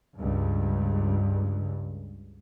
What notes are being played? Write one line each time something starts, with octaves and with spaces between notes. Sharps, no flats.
C#2 G2